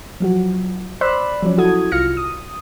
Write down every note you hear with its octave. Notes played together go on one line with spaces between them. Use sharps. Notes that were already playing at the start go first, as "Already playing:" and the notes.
F3 F#3 F#4
C5 D5 B5 C6 E6 F#6
F3 F#3 C#4
E4 F#4 A4 D#6 G#6
C2 F4 F6 A#6 C#7
D#6